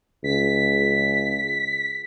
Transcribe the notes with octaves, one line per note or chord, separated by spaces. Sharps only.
C#2 B6